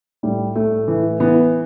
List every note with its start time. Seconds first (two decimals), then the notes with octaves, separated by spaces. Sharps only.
0.23 A2 G3
0.55 A2 A3
0.88 E3
1.20 E3 B3